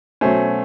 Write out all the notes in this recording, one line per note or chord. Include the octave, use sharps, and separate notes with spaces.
B2 F#3 A3 C#4 C5